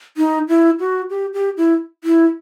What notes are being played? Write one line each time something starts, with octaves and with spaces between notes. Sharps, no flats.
D#4
E4
F#4
G4
G4
E4
E4